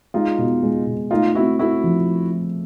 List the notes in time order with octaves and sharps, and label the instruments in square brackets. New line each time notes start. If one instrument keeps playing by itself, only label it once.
[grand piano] G#3 [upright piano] D#4 F4
[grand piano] B2
G#3
B2
[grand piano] A3 [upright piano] D#4 F4
[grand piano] C4 [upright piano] E4 F#4
[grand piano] A3 [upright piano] E4 F#4
[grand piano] F3